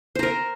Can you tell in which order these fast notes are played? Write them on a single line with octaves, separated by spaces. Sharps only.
C5 A#5 A#4